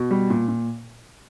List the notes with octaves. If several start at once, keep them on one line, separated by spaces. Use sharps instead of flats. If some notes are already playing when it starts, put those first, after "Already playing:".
Already playing: B2
G3
A#2
A#2